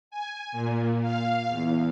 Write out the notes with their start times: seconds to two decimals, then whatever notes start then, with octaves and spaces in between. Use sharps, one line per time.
0.11 G#5
0.52 A#2
1.02 F5
1.49 E2